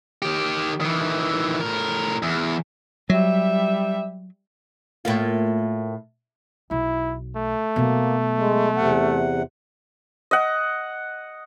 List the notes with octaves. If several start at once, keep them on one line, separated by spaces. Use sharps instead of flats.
D#3 G4
D#3 E3
A2 A#4
E2
F#3 G3 E5
A2 A#3 F4
B1 E4
A3
B2 F#3 A#3
G#3
E2 C3 F#5
D#5 F#5